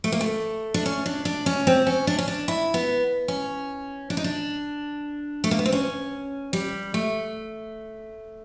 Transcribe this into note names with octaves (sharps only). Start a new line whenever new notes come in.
A3
A#3
A3
D4
C#4
D4
D4
C#4
C4
C#4
D4
C#4
D4
E4
B3
C#4
D4
D#4
D4
A3
A#3
B3
C4
C#4
G3
A3